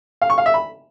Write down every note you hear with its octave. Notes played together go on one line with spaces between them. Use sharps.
F5
C#6
F5
E5
B5